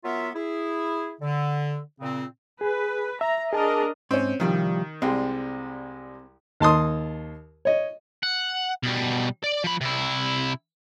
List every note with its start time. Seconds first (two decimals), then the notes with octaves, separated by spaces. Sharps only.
0.05 F#3 B3 F4 A#4 E5
0.35 E4 G#4
1.21 D3
2.01 A#2 C#3 C4
2.61 G#4 B4
3.21 E5 A#5
3.53 D4 G#4 A#4 D#5 A5
4.11 G#2 C4 C#4
4.40 C2 D#3 F3 G3
5.02 C2 G3 G#3 C4
6.60 D#2 A5 C6 D#6
7.65 C#5 D#5
8.23 F#5
8.83 B2 G3
9.44 D5
9.64 F3 B5
9.81 C3 E4